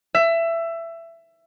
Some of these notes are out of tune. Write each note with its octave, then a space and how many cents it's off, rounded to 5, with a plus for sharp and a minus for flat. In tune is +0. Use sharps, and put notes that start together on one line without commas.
E5 +20